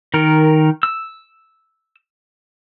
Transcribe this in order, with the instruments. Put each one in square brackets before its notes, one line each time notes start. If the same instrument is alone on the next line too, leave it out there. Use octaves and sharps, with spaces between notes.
[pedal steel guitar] D#3 A#4
E6